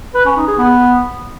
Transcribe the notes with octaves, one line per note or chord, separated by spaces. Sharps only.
B4
C#4
D#4
G#4
B3